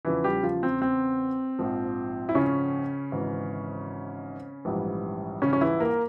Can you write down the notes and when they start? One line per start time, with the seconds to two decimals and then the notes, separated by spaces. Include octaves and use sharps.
0.05 E2 C#3 E3 F3 E4
0.24 G3 G4
0.43 F3 F4
0.63 C4
0.82 C4
1.59 A#1 G#2 F3
2.29 E4
2.35 C#3 C#4
3.12 G#1 G#2 E3
4.65 A#1 G#2 E3 G3
5.42 C#3 C#4
5.53 C#4
5.61 E3 E4
5.80 A#3 A#4